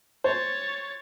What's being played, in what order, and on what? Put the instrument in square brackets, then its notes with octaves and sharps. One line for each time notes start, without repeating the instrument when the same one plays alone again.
[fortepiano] C5 [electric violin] C#5 A6